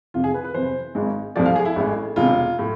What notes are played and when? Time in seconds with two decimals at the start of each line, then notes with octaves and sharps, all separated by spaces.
0.14 F1 F2 C3 F4
0.24 G#4
0.34 B4
0.44 B4
0.54 F2 C3 E3 C5
0.95 G#1 G#2 G#3
1.35 C2 C3 F3 A3 D5
1.46 F5
1.56 G#4
1.65 E4
1.76 A1 A2 G#3
2.16 E1 E2 C3 F4
2.59 A2